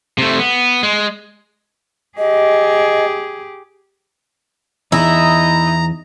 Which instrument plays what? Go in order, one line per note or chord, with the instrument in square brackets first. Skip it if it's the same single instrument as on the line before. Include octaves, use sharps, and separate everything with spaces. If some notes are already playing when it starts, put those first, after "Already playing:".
[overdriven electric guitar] C3 A3
B3
G#3
[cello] G4 G#4 [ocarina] D#5
[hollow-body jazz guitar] E2 [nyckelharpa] D#4 D#5 [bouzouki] E4 [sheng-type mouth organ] A#5